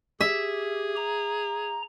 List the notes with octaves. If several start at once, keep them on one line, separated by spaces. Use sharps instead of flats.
G4 G#4 E5
A#5